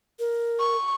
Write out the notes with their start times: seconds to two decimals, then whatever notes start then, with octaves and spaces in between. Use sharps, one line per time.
0.19 A#4
0.59 C#6